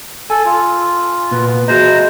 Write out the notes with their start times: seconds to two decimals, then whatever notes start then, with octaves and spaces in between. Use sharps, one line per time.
0.30 A4 G#5
0.45 F4
1.31 A#2 B3
1.68 F#4 G#4 C5 D#5 A#5